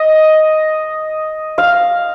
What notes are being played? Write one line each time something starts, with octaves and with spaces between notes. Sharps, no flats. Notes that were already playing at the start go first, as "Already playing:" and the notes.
Already playing: D#5
F5